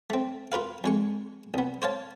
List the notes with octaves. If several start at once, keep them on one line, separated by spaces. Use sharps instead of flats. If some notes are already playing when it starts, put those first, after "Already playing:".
A3 C4
F4 A#4 B4 F5
F2 G#3 C#6
C2 B3
C5 C#5 F5 A5